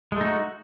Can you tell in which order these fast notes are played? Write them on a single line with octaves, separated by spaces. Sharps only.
G#3 A3 D#4 F#4